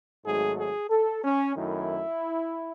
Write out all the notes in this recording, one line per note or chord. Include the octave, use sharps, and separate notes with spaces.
G#1 G#2 F#3 A3 G#4
G#4
A4
C#4
F#2 D#3 A3 E4